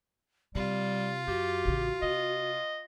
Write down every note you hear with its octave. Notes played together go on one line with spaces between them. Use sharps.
C3 G3 F4 G4
F#2 F#4 G4
A1 C#3
C3 D#5